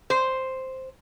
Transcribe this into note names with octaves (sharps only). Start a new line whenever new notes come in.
C5